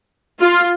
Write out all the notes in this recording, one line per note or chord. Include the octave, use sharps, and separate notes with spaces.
F4